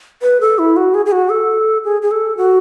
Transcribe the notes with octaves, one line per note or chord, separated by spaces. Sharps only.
B4
A4
E4
F#4
G#4
G#4
F#4
A4
G#4
G#4
A4
F#4